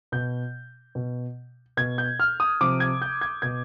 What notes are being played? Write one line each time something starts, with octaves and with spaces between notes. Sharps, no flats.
B2 G6
B2
B2 G#6
G6
F6
D#6
C3 F3 D6
G#6
G6
G#6
B2 G#6